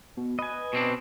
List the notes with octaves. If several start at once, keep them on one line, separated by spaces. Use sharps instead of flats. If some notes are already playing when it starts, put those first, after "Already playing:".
B2
B4 D#5 G#5
B2 C4 D4